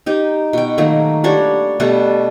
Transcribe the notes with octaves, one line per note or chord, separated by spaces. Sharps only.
D#4 G4 G5
B2 G5
D#3 F#3 A3 A#3
G3 D4 F#4 C#5
B2 G3 A3 B4